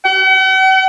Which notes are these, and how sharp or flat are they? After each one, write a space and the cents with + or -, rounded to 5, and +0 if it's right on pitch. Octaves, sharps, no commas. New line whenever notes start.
F#5 +45